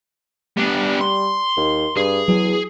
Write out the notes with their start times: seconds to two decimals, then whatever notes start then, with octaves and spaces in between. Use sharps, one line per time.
0.57 G3 B3 D4
1.01 C6
1.57 D#2
1.97 G2 G#4
2.28 E2 F#3